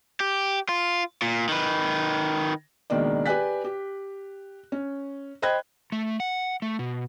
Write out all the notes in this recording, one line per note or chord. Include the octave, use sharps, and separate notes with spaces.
G4
F4
A#2
D#3 B4
C#2 B2 D#3 A#3 D4 D5
G4 B4 D5 G#5 F#6 B6
G4
C#4
C5 D#5 G5 B5 F#6 G#6
A3
F#5
A3
B2